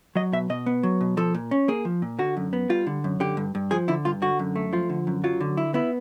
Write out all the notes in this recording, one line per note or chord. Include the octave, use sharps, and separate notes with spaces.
F#3 D#5
B2 E5
B2 D#5
B3
F#3
B2
F3 A4
A#2
C#4
A#3 G#4
F3
A#2
D3 F#4
F#2
B3
G3 F4
D3
F#2
D3 G4
G2
G2
F3 G#4
D3 E4
G2 F4
D3 F#4
F#2
A3
F3 F4
D3
F#2
F#3 F4
D3
E4
B3 E4